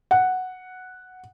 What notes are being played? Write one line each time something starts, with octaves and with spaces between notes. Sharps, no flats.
F#5